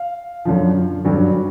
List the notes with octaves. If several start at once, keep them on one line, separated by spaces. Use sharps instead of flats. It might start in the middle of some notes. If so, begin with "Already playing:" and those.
Already playing: F5
F#2 D3 F3
G2 D3 F#3